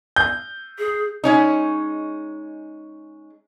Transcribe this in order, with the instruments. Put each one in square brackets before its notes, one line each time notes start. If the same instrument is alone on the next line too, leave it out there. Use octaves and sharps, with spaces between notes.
[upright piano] G6
[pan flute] G#4
[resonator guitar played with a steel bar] G#3 C#4 D#4